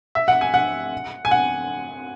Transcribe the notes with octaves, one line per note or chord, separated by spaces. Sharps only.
E5
F#5
G#5
F#5
G#5
F#5